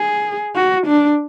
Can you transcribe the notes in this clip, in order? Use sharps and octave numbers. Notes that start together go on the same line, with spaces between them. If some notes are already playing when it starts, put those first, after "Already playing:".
Already playing: G#4
F#4
D4